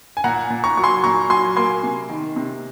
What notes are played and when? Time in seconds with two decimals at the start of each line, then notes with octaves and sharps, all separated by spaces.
0.17 G#5
0.24 A#2 F#5 A#5
0.50 A#2
0.64 A#5 C#6
0.77 F#3 C#6
0.84 G#5 C6
1.04 A#2 A#5 C#6
1.30 F#3 G#5 C6
1.56 A#3 G#5 C6
1.83 C3
2.09 D#3
2.36 C3